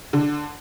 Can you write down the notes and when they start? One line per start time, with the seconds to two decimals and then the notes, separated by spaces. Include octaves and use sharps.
0.13 D3